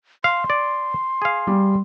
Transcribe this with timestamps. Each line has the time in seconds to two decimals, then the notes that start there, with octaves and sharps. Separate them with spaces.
0.24 F5 C6
0.50 D5
1.22 G#4 F5
1.47 G3